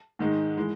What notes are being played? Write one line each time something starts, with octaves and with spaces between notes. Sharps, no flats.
G#2 D#3 G#3 D#4
E3 G#3